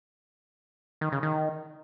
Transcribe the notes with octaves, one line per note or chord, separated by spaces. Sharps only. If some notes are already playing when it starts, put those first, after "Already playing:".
D#3
C#3
D#3